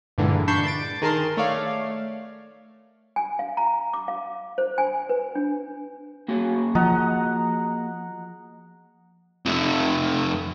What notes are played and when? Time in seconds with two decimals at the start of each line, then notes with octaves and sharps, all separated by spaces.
0.18 G2 A#2 D3 E3 G#3
0.47 D4 A5 B5 C#6 G6 C7
0.67 A6 D7
1.02 D#3 G#4 A#4 A5 C6
1.37 A3 C#5 D5 F5
3.16 G#5
3.39 F5
3.57 A#5
3.94 D6
4.08 F5
4.58 C5
4.78 G#5
5.09 B4
5.35 D4
6.28 A#3 F#4 G#4
6.75 F3 D#5 F#5 A#5
9.46 F2 A3